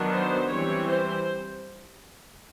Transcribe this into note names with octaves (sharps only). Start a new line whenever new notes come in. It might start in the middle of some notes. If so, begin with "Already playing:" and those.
Already playing: D#3 F#3 B3 D4
C5
E3 G3 C4 C#5
C5